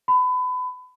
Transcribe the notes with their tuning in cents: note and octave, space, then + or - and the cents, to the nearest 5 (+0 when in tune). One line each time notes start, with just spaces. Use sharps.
B5 +30